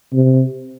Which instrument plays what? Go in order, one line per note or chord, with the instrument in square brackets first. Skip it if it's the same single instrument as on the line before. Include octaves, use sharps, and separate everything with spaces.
[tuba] C3